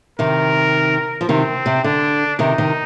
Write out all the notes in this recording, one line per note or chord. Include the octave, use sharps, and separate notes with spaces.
C3 D#3 A#4
F3
C3 D#3 C4
C3
D3 D4
C3 D#3 D#4
C3 D#3